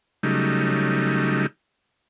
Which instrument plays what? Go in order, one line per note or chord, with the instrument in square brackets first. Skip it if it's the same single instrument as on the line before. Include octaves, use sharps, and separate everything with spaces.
[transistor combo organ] C#3 F#3 G3 A3 D#4